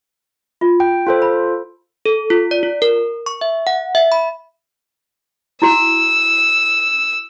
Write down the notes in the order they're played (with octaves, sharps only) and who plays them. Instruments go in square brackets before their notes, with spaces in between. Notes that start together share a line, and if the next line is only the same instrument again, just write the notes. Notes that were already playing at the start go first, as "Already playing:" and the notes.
[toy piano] F4
[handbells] G5
F4 A4 C5
[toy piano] B5
[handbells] A4
F4
D5
F4
A#4
C#6
E5
F#5
E5
B5
[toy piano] E4 F#4 [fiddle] E6